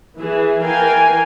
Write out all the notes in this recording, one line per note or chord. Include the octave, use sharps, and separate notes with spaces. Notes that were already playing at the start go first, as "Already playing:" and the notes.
E3 G#4 E5
E3 A#4 F5 G5 G#5